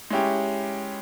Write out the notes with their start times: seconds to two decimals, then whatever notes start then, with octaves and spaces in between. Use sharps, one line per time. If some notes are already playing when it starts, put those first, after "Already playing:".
0.10 G#3 C#4 E4 G4